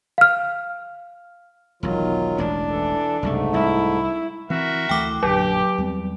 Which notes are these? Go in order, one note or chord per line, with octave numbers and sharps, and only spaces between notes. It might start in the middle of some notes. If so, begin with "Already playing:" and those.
F5 F6
E1 B1 D#3 F#3 F4
E1 A1 G#3 D4
E3 A4
F#1 C2 G#2 C3 A3
C2 E4
E3 C4 F#4 A#4 E5
D2 E3 A3 G5 D6
A#1 F#2 D3 F#3 G4
E2 G3 C4